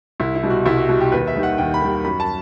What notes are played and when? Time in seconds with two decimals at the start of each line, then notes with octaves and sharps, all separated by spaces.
0.20 C2 E4
0.35 E4
0.43 B2 G3
0.50 F#4
0.66 C2 E4
0.77 F#4
0.89 B2 G3 F#4
1.01 G4
1.12 D#2 B4
1.27 E5
1.35 D#3 G3
1.43 F#5
1.58 D#2 G5
1.74 B5
1.81 D#3 G3
2.04 F#2 B5
2.20 A5